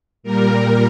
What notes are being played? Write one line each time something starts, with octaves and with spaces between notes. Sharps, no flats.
A#2 G3 A#4